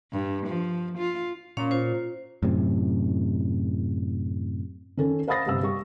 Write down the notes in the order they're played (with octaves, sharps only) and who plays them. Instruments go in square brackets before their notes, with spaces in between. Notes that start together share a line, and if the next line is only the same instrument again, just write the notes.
[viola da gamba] G2
F3
F4
[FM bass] A#2 [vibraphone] C#4 C#5 F5
[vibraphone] F4 C5
[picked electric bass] F#2 A2 C3
[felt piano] D#3 C#4 A4
C5 F5 B5 D#6 A6 A#6
G1 G2 C3 F5 E6
G3 G4 C#6